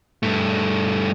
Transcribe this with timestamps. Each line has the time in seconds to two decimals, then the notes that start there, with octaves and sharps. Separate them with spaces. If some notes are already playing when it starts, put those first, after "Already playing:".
0.23 G2 A3